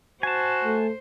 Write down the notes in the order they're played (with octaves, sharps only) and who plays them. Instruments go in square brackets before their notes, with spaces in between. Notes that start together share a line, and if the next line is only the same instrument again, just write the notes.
[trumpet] F#4 [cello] C5 [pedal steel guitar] G#5 A5
[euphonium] A3